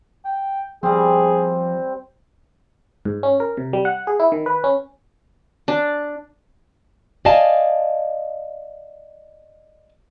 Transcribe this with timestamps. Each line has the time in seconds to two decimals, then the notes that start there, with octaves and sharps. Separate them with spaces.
0.25 G5
0.83 F3 G3 C4 G#4
3.05 G#2
3.23 C#4
3.40 A#4
3.57 C3
3.73 G3
3.85 F#5
4.07 G#4
4.20 E4
4.32 D#3
4.46 B4
4.64 C#4
5.68 D4
7.25 D5 D#5 F5 G#5 A5